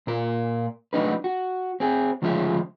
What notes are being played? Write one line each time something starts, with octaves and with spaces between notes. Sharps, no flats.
A#2 A#4
F#3 A3 D4 D#4 B4
F#4
C4 G#4
D2 C#3 F3 G#3 F4 E5